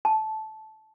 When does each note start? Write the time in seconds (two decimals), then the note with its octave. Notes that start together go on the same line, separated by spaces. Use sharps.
0.05 A5